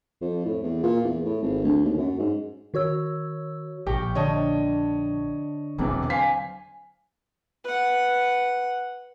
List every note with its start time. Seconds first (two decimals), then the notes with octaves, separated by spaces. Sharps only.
0.21 F2
0.45 A2
0.63 E2
0.83 A#2
1.05 E2
1.25 A2
1.43 G#1
1.64 D2
1.85 D#2
1.97 F#2
2.19 G#2
2.74 D#3 F#4 C#5 E6
3.87 A#1 G4 A#4 G5 C#6
4.15 D3 C#5 D#5 A5
5.78 E1 C3 E3 F#3 C4 D6
6.10 C5 F5 G#5 B6 C7
7.64 B4 F#5